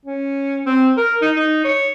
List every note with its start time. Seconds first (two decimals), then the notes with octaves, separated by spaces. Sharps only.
0.06 C#4
0.66 C4
0.97 A#4
1.22 D#4
1.36 D#4
1.65 C#5